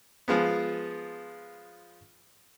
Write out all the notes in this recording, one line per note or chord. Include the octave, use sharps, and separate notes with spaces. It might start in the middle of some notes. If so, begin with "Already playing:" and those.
F3 G#3 B3